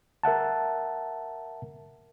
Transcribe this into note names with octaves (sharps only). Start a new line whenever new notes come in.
A#4 E5 F#5 A5